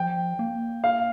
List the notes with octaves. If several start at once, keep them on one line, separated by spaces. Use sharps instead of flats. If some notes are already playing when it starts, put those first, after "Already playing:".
Already playing: F3 G5
A#3
F5